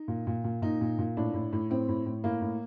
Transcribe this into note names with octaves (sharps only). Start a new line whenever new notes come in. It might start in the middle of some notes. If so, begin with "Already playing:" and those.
Already playing: D#4
A#2
A#2
A#2
A#2 D#4
A#2
A#2
A2 D4
A2
A2
A2 C4
A2
A2
A2 A#3
A2